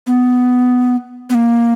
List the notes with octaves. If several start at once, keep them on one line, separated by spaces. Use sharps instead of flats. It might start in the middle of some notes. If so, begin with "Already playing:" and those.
B3
B3
A#3